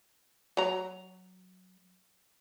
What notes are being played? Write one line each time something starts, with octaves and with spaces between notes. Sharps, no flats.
F#3 A#5